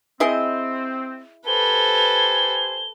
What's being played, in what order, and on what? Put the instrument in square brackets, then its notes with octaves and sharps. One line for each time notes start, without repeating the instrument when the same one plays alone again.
[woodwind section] C4 [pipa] E4 G#4 D#5
[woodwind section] G4 C5 G#5 [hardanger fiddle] A4 B4 [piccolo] G7